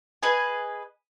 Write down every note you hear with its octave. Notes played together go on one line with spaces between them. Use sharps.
G#4 B4 D#5 G#5